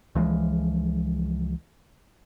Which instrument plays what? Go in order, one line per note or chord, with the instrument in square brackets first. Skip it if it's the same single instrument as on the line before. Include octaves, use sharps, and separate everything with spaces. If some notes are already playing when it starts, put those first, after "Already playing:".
[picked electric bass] C#2 E3 F3 G#3